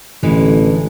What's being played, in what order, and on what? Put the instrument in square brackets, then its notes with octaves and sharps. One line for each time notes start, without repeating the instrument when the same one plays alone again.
[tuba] A1 [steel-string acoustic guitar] D3 E3 G#3